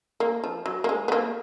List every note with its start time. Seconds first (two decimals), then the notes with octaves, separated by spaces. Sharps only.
0.20 A#3
0.44 F3
0.66 F#3
0.84 A#3
0.89 G#3
1.08 B3
1.12 A#3